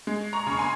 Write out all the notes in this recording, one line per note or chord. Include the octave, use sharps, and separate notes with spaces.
G#3
A#5 C#6
C#3 C#6
G#5 C6